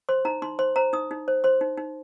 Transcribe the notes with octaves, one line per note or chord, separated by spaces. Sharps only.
C5 C6
D#4 A#5
D#4 C6
C5 C6
C5 A#5
D#4 D#6
D#4
C5
C5 C6
D#4
D#4